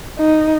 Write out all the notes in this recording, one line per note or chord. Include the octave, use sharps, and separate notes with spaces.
D#4